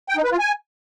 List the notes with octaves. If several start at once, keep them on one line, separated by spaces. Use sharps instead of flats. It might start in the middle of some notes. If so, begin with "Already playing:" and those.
G5
D#4
B4
F4
G#5